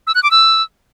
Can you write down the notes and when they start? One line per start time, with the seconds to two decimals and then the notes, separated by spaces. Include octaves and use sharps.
0.07 E6
0.15 F#6
0.23 D6
0.31 E6